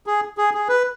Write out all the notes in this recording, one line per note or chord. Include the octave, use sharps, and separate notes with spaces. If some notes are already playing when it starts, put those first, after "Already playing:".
G#4
G#4
G#4
B4